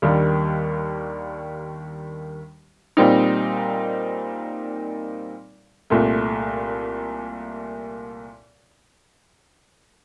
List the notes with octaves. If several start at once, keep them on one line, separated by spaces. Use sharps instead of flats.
D#2 D#3 G3 A#3 D4
A#2 G3 C4 D#4
C2 A#2 A3